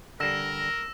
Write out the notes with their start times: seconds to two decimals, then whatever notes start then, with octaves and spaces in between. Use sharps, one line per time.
0.20 D3 G3 A#4 E6 A#6 E7